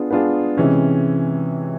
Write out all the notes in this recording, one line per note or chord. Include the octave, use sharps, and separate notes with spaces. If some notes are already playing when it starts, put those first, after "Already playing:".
Already playing: B3 D4 F4 G#4
B3 D4 F4 G#4
C3 E3 G#3 C#4